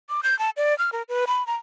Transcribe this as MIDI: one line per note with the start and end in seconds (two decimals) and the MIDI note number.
0.09 0.21 86
0.23 0.38 91
0.39 0.50 81
0.57 0.77 74
0.78 0.90 89
0.92 1.02 70
1.09 1.25 71
1.27 1.45 83
1.47 1.55 82